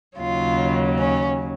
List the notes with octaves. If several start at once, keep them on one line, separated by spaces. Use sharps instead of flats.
D#2 C#3 F#3 F4
C#4